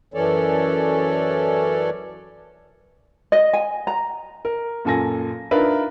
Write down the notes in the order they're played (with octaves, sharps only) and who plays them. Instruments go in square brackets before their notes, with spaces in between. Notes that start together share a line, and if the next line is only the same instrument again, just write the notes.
[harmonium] F#2 E3 C#4 A4 C#5 D5
[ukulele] D#5
G#5
A#5
[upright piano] A#4
F#2 A#2 A4 G#5 A#6
D4 D#4 F4 A#4 B4 E5